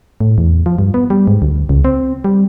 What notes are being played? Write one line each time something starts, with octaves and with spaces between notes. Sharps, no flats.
A2
E2
F3
G2
B3
G3
G#2
D2
C#2
C4
G3